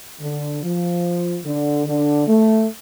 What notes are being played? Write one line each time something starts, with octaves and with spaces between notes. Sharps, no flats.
D3
F3
D3
D3
A3